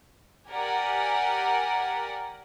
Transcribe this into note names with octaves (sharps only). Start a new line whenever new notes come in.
G4 A#4 D5 F#5 G#5